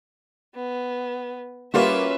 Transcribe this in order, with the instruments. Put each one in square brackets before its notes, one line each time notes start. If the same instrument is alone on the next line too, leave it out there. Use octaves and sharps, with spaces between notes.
[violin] B3
[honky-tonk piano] G3 A#3 [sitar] C#4 F4 F#4 [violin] B4 E5